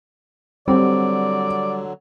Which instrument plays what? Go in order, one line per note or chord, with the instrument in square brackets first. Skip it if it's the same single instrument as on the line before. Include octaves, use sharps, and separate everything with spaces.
[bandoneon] D3 F#3 [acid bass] G3 [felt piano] C4 [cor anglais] D5